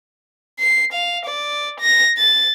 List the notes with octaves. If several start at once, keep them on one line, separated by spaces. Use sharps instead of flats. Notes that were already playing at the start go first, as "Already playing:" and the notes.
C7
F5
D5
A#6
A6